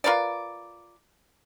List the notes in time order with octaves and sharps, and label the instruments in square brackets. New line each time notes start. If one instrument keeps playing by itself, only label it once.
[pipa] F4 A#4 B4 D5